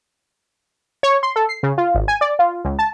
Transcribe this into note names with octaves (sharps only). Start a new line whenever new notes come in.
C#5
C6
A4
C7
C#3
F4
G#1
G#5
D5
F4
C#2
A5